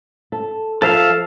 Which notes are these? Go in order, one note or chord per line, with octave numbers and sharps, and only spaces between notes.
A4
F3 A4 E5 F5